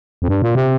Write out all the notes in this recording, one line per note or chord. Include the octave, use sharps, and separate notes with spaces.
F2
G2
A#2
C3